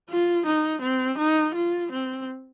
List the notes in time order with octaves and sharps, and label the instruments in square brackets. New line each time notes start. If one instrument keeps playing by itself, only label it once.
[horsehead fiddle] F4
D#4
C4
D#4
F4
C4